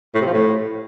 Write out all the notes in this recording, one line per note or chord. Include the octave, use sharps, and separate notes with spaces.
A2
C3
F3
A2